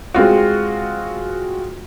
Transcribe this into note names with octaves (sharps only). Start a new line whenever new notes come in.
G#3 C4 F4 F#4